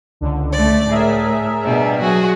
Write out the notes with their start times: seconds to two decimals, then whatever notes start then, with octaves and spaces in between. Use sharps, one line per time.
0.21 C#2 D3
0.51 A3 D5
0.88 A2 G#4 A#4 E5
1.64 B2 G3 D4
2.00 F#3 F#4 G#4